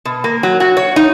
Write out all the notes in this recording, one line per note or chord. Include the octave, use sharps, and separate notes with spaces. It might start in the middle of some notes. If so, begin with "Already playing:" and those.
B2
A#3
F#3
F#4
C#5
D#4